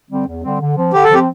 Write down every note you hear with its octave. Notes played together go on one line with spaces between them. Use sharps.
D3 G3 C4
E2
D3 G3 C4
D3
F3 C4
D3 G4
A4
F3 C4 G4